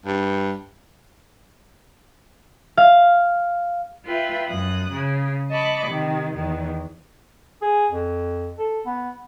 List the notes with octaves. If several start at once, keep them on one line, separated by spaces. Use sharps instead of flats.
G2
F5
F4 B4 E5 G5
F#2 D#6 F#6
C#3
D#5 A5 B5 C#6 D6
C3 D#3
E2 D#3
G#4
F2
A4
B3